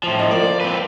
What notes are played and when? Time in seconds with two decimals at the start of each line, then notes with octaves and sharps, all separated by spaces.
0.03 A2 F3
0.19 D#5
0.31 F3 A#3 D5
0.60 C4 B4